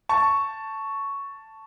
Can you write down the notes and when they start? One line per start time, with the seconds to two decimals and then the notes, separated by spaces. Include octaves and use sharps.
0.09 A5 C#6